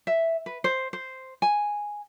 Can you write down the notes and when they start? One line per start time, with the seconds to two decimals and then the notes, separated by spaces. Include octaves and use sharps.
0.07 E5
0.46 B4
0.64 C5
0.93 C5
1.42 G#5